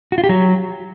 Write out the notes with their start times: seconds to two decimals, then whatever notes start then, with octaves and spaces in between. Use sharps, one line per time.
0.12 F#4
0.18 F4
0.24 G4
0.29 F#3